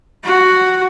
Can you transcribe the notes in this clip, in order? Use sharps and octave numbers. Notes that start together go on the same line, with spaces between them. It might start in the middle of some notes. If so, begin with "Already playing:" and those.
F#4